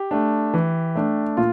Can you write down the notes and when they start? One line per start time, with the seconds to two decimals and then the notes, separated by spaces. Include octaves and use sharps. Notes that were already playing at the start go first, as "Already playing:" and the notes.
Already playing: G4
0.11 A3 D4
0.54 E3
0.96 A3 D4
1.37 A#2 F4